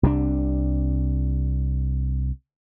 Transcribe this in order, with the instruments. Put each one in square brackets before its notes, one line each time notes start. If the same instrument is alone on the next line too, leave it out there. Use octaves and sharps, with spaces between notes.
[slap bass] C2 C3 D#3 D4